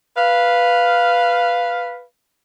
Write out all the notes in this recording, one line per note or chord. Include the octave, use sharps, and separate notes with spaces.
B4 F5